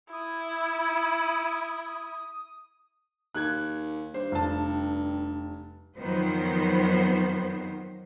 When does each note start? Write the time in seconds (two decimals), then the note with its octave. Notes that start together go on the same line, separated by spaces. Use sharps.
0.12 E4 D#6
3.35 D#2 F#6 G#6
4.14 G2 C5
4.32 F1 A5
5.97 F2 D#3 F3 F#3 B3 C5